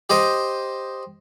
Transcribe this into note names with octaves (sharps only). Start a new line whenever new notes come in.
G4 C5 D#5 D#6